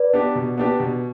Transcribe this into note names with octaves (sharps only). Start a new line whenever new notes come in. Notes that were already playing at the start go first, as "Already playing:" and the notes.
Already playing: B4 D5
B3 D4 G4
B2
B3 D4 G4
B2